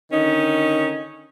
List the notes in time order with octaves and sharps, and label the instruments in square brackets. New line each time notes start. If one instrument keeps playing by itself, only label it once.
[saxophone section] D3 D#3 C#4 D#4